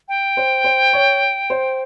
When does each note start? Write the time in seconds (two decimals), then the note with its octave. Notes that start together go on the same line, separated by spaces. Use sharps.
0.08 G5
0.37 C5
0.64 C5
0.93 C#5
1.50 C5